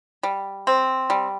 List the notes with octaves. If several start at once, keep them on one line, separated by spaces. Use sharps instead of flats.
G3
C4
G3